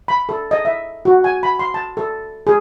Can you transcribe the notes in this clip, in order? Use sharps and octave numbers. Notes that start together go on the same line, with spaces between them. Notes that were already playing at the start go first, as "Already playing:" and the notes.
B5
A4
D#5
E5
F#4
G#5
B5
C6
A5
A4
G#4